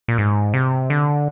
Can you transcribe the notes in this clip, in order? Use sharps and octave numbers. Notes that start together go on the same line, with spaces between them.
A#2
G#2
C3
D3